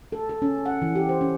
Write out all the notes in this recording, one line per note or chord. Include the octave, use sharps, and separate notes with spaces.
A4
A4
C#4
F#5
E3
G4
C5
C#4